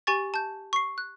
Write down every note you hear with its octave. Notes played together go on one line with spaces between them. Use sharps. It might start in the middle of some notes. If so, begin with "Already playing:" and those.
G4 G#5 C#6 A6
A5 G6
C#6 C7
F#6